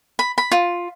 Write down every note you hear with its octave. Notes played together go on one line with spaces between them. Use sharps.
B5
B5
F4